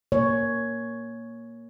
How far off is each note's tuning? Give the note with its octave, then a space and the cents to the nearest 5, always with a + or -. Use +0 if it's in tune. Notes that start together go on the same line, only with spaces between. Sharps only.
A#3 +0 C#5 +5